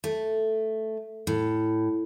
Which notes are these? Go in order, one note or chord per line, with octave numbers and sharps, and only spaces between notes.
A3
A2